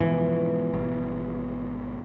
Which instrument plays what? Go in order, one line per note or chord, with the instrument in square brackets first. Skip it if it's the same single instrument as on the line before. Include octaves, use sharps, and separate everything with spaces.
[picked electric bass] G#2 B2 F3 [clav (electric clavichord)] E3
[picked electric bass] G#1 B2 G3